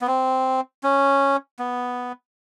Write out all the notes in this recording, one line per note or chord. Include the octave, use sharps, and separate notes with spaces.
B3
C4
C#4
B3